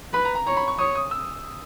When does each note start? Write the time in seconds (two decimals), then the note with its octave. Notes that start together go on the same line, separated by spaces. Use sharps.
0.13 B4 B5
0.25 A#5
0.35 A#5
0.47 C#5 A#5
0.57 B5
0.68 C#6
0.78 C#5 D#6
0.95 D#6
1.11 E6